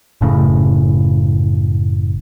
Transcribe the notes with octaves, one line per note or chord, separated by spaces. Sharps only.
F#1 A2 C#3